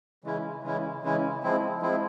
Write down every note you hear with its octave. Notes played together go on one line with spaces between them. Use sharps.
C#3 E3 G#3 C#4 E4
C#3 E3 G#3 C#4 E4
C#3 E3 G#3 C#4 E4
F3 G#3 C4 E4
F3 G#3 C4 E4